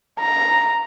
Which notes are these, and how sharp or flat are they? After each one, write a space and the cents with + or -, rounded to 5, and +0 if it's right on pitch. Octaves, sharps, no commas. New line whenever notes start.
A#5 +0